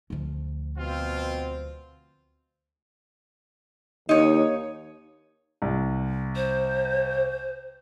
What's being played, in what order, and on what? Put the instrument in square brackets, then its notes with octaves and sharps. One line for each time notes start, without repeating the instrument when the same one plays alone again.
[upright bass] D2 F3
[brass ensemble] B2 C4 F4
[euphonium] D#2 [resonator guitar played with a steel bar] D#4 C#5
[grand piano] C2
[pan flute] C5